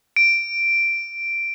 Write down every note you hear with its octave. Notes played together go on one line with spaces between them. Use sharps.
D7